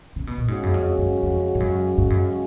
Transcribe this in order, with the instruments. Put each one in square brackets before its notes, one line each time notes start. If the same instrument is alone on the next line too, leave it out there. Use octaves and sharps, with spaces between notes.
[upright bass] C#3
B2
A#2
[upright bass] G#2 [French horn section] C#3 G#3 C#4 F#4
[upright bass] F#2
F2
F#2
F2
G#2
F#2
G#2
F#2